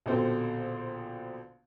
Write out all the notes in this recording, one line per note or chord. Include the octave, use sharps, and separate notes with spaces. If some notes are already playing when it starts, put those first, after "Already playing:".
A#1 B2 D3 C4 C5